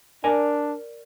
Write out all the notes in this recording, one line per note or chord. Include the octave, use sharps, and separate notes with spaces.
D4 A#4 D5 G#5